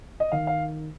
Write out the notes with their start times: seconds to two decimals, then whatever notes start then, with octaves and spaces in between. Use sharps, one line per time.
0.20 D#5
0.32 D#3 F5
0.47 F5